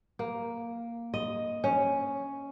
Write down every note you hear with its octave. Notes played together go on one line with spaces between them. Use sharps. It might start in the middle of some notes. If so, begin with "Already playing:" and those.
A#3
D#5
C#4